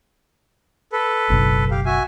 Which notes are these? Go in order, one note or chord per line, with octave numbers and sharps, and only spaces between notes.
A4 B4
F#1 B1 B2
G4 F5
F#4 E5 G#5